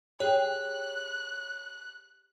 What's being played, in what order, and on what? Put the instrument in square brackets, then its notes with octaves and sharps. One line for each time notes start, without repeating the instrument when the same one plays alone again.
[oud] G4 G#4 [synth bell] C#5 [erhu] F#6